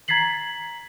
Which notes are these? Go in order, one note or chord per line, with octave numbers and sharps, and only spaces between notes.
A#5 G#6 A6 B6 C7 F#7